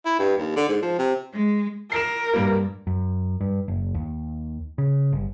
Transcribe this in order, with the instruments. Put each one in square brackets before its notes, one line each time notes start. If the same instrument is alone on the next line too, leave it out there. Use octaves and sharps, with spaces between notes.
[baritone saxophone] E4
G2
D#2
D3
G#2
F3
C3
[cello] G#3
[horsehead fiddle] A#4 [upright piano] C7 E7
[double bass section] G2 [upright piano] G3 A#3
[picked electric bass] F#2
G2
F#1
D#2
C#3
G1